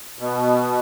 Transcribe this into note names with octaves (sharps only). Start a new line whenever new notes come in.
B2